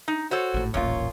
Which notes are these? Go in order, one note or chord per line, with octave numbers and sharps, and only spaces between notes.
D#4
F#4 A4 C5 C#5
G#1 A2
D#1 A1 F#2 A#2 F4 C#5